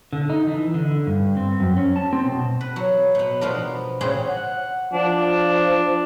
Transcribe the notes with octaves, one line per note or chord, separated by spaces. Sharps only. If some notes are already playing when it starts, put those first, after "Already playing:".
D3
D#4
E3
D3
G2
C4
F#2
C#4
A5
C4
B2
B4
F#3
B2 B3
B2 F3 B3 D4 A#4
A#2 C#3 C4 F#4 G#4
F#5
F3 D4